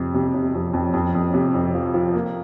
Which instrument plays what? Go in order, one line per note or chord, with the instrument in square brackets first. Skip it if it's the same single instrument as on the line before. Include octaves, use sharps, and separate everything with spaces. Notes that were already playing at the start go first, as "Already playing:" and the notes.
Already playing: [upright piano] F2 C3
C3
C3
F2
F2
F2
F2
C3
F2
F3
F3
A#3